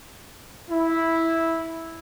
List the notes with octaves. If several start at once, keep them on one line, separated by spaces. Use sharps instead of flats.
E4